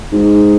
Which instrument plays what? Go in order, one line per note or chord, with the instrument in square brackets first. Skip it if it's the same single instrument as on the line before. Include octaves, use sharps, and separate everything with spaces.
[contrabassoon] G#2